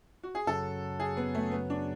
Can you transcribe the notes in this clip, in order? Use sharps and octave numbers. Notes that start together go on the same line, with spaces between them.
F#4
G#4
F#2 C#3 F#3 A4
G#4
B3
A3
B3
D4